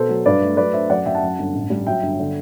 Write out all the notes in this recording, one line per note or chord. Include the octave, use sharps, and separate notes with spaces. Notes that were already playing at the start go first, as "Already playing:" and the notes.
Already playing: B2 A4 C5
F#3
G2 B4 D5
A3
F#3 B4 D5
D4 C5 E5
F#2 D5 F#5
F#2 E5 G5
F#5 A5
F#2
G1
A1
G3
F#3 E5 G5
G1
D3